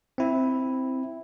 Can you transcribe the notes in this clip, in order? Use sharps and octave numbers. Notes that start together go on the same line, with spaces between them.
C4 E4